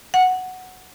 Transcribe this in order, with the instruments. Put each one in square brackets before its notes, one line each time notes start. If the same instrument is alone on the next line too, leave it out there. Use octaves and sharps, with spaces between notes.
[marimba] F#5